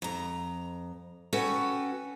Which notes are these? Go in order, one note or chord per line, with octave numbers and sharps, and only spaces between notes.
F2 A#5
C#4 F#4 A4 B4 G5